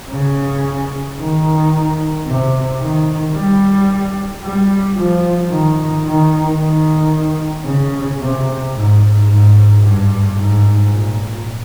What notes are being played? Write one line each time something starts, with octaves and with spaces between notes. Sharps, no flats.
C#3
D#3
C3
D#3
G3
G3
F3
D#3
D#3
D#3
C#3
C3
G#2
G#2
G2
G#2
A#2